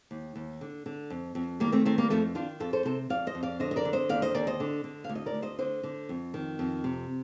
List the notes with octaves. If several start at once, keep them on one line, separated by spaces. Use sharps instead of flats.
D#2
D#2
D3
D3
F2
F2
D#3 G3 A#3
A3 C4
D#3 A3 C4
G3 A#3
F2 F3 A3
D#3 D4 F4
F2 F4 A4
A4 C5
C3 A4 C5
F2 D5 F5
C5 D#5
F2
D5 F5
D3 C5 D#5
D#5
A#4 D5
D3
C5 D#5
D#2 D5 F5
C5 D#5
D#2 A#4 D5
C5 D#5
D3
D3
D2 F5
D#5
A#4 D5
D2
C5 D#5
D3 C5 D#5
D3
F2
D#3
F2
C3